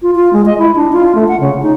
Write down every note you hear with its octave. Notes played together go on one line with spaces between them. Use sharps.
F4
F4
G#3
D#5
E4
D4
F4
A3
F#5
C#3
D#4